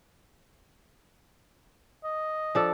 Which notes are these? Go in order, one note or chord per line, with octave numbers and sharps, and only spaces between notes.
D#5
F3 D4 A4